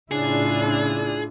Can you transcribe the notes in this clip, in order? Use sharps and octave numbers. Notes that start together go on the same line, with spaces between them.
A2 C#3 D4 E4 F4 G#4